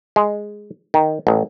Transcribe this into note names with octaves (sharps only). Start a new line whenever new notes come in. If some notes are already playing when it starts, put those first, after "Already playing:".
G#3
D#3
A1